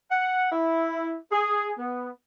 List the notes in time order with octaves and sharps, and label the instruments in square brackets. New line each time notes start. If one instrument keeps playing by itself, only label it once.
[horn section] F#5
E4
G#4
B3